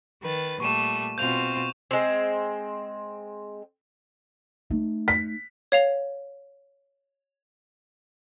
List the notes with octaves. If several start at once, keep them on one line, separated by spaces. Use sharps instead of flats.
D#3 B4 A6
A#2 G3 A3 C#6 D#7 E7
B2 C4 F4 G6 F7
G#3 C4
A3 D#4
B6
C#5 F5 F7